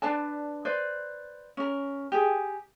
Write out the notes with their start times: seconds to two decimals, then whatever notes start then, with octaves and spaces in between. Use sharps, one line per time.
0.02 D4 B4 D5 A5
0.65 B4 C5 D5
1.57 C#4 A#4
2.12 G4 G#4